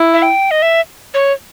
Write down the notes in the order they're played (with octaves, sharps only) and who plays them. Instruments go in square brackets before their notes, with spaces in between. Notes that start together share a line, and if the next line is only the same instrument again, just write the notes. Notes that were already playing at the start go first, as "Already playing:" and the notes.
Already playing: [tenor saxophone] E4
[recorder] E5
G5
D#5
E5
C#5